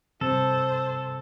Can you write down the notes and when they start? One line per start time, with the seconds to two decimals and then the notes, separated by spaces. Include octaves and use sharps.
0.21 G2 C3 A4 C5